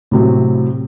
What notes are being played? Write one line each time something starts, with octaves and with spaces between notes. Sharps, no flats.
A2 C3 F#3